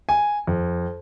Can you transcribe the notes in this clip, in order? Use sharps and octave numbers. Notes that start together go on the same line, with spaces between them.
G#5
F2